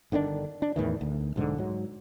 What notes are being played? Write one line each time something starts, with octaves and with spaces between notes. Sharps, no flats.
G1 D3 D#3 D4
D4
E2 A2 D#3 E3
D2
B1 G#2 D3
G#2 F#3